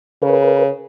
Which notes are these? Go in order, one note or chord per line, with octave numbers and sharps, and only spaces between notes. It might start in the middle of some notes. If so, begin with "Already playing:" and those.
C#3 A#4 B4